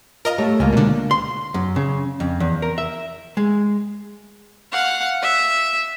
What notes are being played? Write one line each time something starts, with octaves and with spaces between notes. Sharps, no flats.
F4 A#4 D#5 A#5
G3 A3 C#5
C#2 G#3 A#3 F4
B2 D3
C6
F#2
C#3
F2
E2
A#4
E5
G#3
F5 F#5
E5